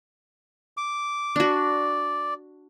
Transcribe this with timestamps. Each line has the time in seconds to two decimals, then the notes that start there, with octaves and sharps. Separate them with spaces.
0.77 D6
1.36 D4 F#4 D5